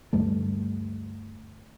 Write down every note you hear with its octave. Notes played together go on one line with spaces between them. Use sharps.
D2 G2 G3 A3